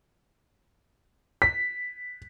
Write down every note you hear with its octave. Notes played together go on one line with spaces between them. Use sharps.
B6